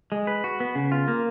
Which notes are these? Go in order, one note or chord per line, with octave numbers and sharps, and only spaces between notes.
G#3
B4
F#4
B3
C#3
F4
A#3